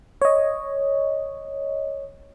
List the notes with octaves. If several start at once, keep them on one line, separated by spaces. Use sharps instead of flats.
C#5 D#5